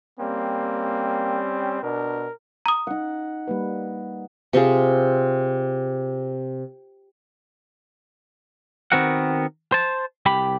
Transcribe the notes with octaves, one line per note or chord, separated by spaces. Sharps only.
G3 A#3 C4 C#4
B2 D4 A#4
A#5 D#6
D#4 F#5
G3 A#3 B4
C3 C4 F4 G#4
D#3 B3 C4 F#4 A#4 F#5
C5 A5
C2 G4 B5